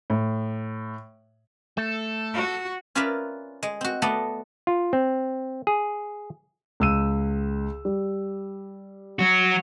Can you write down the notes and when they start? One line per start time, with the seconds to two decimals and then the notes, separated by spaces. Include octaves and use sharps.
0.10 A2
1.78 A3 A4
2.34 F#4
2.95 C#4 F4 A#4 B4 D5 E5
3.63 G#3
3.81 C4 F#4
4.02 A3 B3 A4 D5 D#5
4.67 F4
4.93 C4
5.67 G#4
6.80 C#2 E6 D#7
7.85 G3
9.19 F#3 F#4